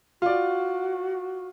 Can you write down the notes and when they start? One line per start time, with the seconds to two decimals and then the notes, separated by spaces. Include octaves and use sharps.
0.22 F4 F#4 D5